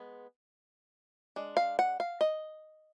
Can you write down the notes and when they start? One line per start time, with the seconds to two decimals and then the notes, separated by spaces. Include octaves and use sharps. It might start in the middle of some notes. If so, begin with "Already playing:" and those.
Already playing: G#3 B3
1.36 G#3 D4
1.57 F5
1.79 F#5
2.00 F5
2.21 D#5